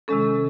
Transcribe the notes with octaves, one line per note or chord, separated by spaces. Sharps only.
C3 D#3 G#3 C#4 A4